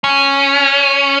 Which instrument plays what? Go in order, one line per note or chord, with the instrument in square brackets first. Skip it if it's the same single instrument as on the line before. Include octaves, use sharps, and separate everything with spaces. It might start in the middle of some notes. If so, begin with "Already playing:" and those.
[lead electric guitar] C#4